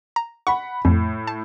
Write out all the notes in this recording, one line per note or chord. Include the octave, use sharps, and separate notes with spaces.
A#5
F#5 B5 C#6
F2 A2
A5